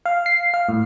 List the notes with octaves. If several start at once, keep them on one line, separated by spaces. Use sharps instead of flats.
F5
C7
F5
A2